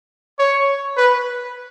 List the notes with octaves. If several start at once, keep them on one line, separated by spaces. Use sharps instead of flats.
C#5
B4